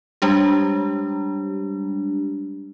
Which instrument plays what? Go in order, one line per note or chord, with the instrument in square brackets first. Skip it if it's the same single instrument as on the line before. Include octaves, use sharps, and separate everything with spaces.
[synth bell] G3 G#3 D4 G4